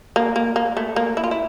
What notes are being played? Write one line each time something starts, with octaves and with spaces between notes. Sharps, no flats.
A#3
A#3
A#3
A3
A#3
E4
F4
E4